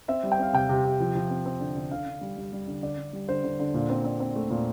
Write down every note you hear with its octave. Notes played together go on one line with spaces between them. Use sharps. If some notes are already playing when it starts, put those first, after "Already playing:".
C4 E5
G3
G5
C4 F5
C3 G5
C3
C3
F3
F3
C4
C4
D3
D3
D3 F5
D3
G3
G3
G3
D3
D3 D5
D3
G3
D3 C5
D3
D3
A#2
C4
C4
C4
A3
A#2